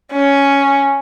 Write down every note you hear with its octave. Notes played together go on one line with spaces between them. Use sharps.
C#4